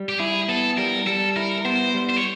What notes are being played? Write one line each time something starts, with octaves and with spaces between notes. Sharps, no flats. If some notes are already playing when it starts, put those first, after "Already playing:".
Already playing: G3
G4
E4 G#4
B3 A4
G3 A#4
G3 A4
E4 A#4
B3 C5
G3
C5
C#5